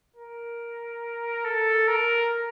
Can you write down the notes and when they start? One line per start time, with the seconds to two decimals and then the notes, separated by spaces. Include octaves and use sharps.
0.16 A#4
1.45 A4
1.88 A#4